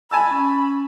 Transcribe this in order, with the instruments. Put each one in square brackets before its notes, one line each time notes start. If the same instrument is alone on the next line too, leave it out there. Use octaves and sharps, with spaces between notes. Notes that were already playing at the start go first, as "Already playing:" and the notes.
[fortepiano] G#5 A5 E6 [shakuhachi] B5
[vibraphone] C#4